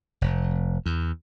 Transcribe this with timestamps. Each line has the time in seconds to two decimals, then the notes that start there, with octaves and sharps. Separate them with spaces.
0.21 F1
0.86 E2